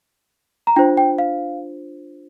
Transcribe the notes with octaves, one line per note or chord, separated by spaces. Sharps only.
A#5
D4 F4 C5 G5
G5
F5